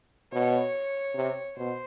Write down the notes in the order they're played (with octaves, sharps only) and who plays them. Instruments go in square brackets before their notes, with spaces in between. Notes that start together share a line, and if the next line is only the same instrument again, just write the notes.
[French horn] B2 [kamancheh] C#5
[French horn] C3
[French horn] B2 [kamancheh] C5